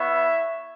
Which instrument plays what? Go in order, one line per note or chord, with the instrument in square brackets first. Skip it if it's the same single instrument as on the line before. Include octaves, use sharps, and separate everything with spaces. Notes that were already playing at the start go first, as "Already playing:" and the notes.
Already playing: [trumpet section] B3 E4 C#5 E5